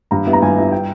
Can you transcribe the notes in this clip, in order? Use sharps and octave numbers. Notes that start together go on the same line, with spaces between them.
G2 A#5
G3 B3 E4
A#5
G2 G#5
G3 B3 E4
G5